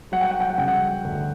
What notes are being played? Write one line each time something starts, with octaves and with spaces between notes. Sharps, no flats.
F#3 F#5
G5
F#5
G5
F#5
C#3 G5
F#5
D2